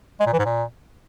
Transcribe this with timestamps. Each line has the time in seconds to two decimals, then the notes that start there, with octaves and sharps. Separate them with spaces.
0.20 G#3
0.26 A#2
0.33 E3
0.39 G#2
0.45 A#2